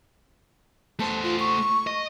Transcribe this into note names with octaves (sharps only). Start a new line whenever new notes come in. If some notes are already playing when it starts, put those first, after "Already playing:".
A3 C5 A5
F4
C#6
D#5